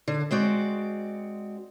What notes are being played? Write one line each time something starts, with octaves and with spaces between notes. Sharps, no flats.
D3
G#3 C4 F#4 D5